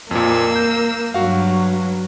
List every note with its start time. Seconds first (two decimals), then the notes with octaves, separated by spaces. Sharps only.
0.11 F2 A#2 A#3 E6
0.56 G6
1.14 G2 F#3 F#4 F5